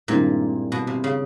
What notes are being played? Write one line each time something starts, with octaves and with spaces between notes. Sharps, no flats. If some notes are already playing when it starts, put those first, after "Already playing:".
G2 A#2 D#3 G#3 C4 E4
B2
C3
C#3